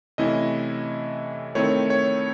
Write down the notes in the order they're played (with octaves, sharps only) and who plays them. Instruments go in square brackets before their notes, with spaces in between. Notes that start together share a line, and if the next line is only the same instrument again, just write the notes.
[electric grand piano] C3 E3 A3 C#4 E4 D#5
D#3 A3 C4 E4 C#5
C#5